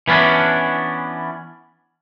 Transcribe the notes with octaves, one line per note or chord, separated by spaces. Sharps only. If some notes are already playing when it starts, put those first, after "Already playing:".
E3 B3 C#4 D4